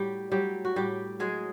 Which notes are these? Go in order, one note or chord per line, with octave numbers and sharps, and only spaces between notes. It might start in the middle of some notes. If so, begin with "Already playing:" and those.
Already playing: A2 F#3 G3 G4
F#3 G3 G4
F#4
A2 G3 G4
F#3 G#3 G#4